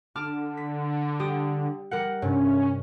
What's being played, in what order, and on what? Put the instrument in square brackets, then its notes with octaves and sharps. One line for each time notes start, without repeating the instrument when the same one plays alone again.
[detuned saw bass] D3 [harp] A5 D6 F6
[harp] B6
G3 G4 D#6
G3 A#4 F#5
[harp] G2 C3 [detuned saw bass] C#4